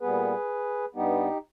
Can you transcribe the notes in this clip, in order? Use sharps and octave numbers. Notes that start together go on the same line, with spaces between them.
A#2 G3 B3 G#4 B4
G2 G3 B3 D#4 G4